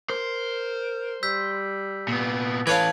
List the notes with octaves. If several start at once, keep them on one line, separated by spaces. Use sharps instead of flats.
A#4 C5
G3 E6 G6 B6
A#2 B3
E3 A4 B4 C#5 F5 G#6